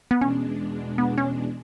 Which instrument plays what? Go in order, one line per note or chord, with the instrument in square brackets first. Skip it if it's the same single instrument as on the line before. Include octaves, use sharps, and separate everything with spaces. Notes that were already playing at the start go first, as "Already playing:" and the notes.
[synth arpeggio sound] B3
[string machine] E2 B2 G#3 D4 [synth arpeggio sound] C#4
[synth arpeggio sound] B3
C#4